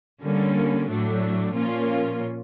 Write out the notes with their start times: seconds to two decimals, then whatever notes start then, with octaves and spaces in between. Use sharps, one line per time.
0.23 D3 G3 A#3 C#4
0.89 A2 F#3 A3 D4
1.54 A#2 F3 A#3 C#4 F4